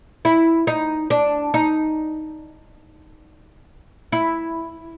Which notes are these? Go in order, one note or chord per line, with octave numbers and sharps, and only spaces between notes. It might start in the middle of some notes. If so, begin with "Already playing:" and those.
E4
D#4
D4
D#4
E4